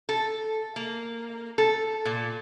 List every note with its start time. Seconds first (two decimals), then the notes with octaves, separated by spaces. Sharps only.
0.09 A4
0.76 A#3
1.58 A4
2.05 A#2